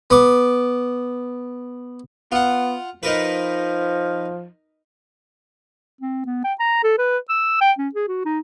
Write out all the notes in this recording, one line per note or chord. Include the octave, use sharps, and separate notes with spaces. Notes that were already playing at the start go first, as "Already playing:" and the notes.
B3 D6
B3 F4 F#5
F3 D#4 A#4 B4
C4
B3
G5
A#5
A4
B4
E6
G5
C#4
G#4
F#4
D#4